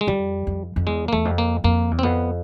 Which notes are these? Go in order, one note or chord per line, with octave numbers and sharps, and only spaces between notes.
G#3
F2 G3
F2
F2
E2 G#3
A#3
E2 A3
F2
A#3
F2 A#3
E2
C4
F2 B3